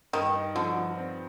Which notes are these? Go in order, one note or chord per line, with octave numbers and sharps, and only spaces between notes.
G2 D#3
D#4
D3 F3
F3
C4